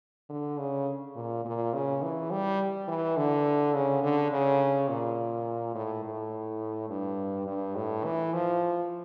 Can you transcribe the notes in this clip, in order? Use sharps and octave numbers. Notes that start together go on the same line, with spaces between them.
D3
C#3
A#2
A#2
C#3
E3
G3
E3
D3
C#3
D3
C#3
A#2
A2
A2
G2
G2
A2
E3
F3